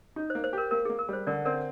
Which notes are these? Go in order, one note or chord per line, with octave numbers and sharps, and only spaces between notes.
D#4
C5
A#3
C5
G4 A#4
A#3 A#4
A#3 G#4
A#4
G3 C5
D3 A#4 D5
C4 A#4 D5